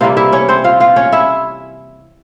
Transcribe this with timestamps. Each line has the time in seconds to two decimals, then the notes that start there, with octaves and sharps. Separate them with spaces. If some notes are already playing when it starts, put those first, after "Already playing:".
0.01 C3 E3 G3 A#3 F4 F5
0.17 E4 E5
0.32 C#4 C#5
0.49 C4 C5
0.64 F4 F5
0.80 F4 F5
0.96 C#4 C#5
1.12 E4 E5